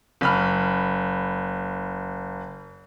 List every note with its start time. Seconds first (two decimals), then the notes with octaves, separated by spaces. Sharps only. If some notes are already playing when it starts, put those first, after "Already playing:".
0.21 F#1 B5 F6